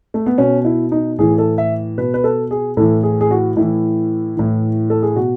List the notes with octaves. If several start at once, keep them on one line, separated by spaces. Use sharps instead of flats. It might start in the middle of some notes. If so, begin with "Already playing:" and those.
A3
B3
B2 C#4
E4
D#4
A2 E3 G#4
A4
E5
B2 B4
B4
A4
G#4
A2 E3 A4
G#4
G#4
F#4
A2 E3 E4
A2 E3
A4
G#4
B2 F#4